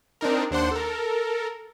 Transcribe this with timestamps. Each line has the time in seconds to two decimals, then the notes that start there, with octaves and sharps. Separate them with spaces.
0.21 C4 D4 D#4 A#4
0.51 D#2 D4 C5 F#5 C6
0.72 A4 A#4